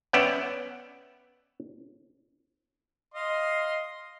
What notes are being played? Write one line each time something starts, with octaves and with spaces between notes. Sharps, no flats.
B3 C#4 D5 E5 F#5 G5
D#5 F5 C6